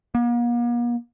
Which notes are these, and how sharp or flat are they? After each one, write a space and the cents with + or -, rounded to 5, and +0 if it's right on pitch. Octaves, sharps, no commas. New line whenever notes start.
A#3 +45